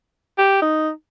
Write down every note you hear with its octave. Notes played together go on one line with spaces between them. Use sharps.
G4
D#4